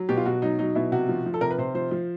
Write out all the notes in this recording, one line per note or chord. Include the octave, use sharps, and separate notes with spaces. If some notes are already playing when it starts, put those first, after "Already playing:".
Already playing: F#3
B2 G4
F4
B2 F#4
F#3 D#4
F#3 D#4
B2 E4
C3 F#4
F3
F3
A4
C3 A#4
B4
C3 C5
F3 C5
F3